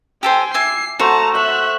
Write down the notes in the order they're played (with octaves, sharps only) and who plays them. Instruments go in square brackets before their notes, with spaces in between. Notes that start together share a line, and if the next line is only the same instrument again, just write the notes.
[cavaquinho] G4 A4 C5 [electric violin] G5 G#5
[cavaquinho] E5 G#5 D6 [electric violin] C7
[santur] A3 C5 F#5 [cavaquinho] F#4 [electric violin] A5 A#5
[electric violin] E5 F#6 [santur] F#5